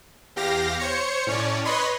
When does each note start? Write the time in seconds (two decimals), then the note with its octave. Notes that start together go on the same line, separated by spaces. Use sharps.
0.36 E2 G4 F5 A#6
0.79 C5 C#5 C#7
1.27 A2 C#4 C#5 D5
1.65 B4 C#5 D#5 B5 C6